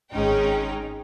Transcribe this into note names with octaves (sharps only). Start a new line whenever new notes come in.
G#1 G#3 C#4 D#4 G5